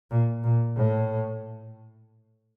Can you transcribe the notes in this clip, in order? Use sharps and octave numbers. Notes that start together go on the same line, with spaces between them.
A#2
A#2
A2